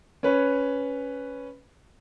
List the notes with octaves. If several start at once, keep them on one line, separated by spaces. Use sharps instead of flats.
C#4 B4 C#5